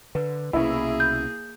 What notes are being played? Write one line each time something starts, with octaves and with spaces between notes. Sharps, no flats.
D3 B4
C2 B2 A#3 C#4 E4 G#4
G6